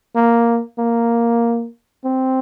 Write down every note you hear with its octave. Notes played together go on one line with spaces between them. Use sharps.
A#3
A#3
C4